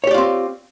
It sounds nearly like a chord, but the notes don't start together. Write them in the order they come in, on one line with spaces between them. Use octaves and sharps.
C#5 G4 D5 F4 C4